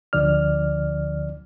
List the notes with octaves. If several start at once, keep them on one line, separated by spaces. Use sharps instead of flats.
D2 D3 F3 D5 F6